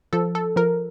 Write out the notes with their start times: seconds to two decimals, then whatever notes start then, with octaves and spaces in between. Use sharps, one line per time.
0.13 F3 A4
0.35 A4
0.56 F3 A#4